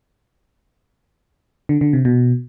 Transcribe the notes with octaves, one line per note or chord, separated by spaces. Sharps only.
D3
D3
C3
B2